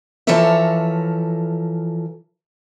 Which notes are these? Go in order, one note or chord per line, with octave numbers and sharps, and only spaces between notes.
E3 F3 A4 A#4 C#5 E5